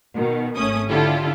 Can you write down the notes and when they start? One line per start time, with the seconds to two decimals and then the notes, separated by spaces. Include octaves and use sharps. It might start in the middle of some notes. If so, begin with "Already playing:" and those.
0.15 B2 D#3
0.56 G#1 A3 C#4 D#6
0.89 D3 E4 F4 G4 A4